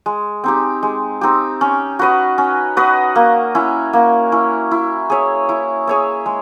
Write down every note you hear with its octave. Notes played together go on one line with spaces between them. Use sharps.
G#3
C4 D#4 G4
G#3
C4 D#4 G4
C#4
F#4 B4 D#5
C#4
F#4 B4 D#5
A#3
C#4 E4
A#3
C#4 E4
E4
G#4 C#5 E5
E4
G#4 C#5 E5
G#3